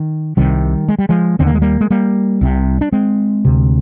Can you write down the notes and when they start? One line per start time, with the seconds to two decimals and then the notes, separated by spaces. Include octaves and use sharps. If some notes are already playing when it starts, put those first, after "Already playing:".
Already playing: D#3
0.37 C2 C3 D#3 G3
0.89 G#3
0.99 G3
1.09 F3 G#3
1.39 D#2 D3 C4
1.47 A#3
1.54 G#3
1.62 G3 A#3
1.81 G#3
1.91 G3 A#3
2.41 C2 C3
2.81 D4
2.92 G#3 C4
3.45 D2 C3